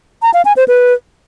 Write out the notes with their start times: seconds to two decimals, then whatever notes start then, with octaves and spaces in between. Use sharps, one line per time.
0.22 A#5
0.34 F5
0.45 G#5
0.57 C5
0.68 B4